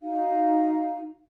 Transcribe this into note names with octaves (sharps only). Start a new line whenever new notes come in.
D#4 F#4 F5